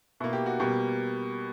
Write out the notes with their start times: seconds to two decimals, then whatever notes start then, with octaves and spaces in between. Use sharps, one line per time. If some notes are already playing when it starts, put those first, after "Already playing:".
0.20 B2 A#3 E4
0.33 G4
0.46 F#4
0.60 B2 G3 A#3 G4